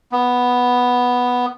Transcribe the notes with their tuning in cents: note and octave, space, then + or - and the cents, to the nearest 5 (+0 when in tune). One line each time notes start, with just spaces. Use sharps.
B3 +0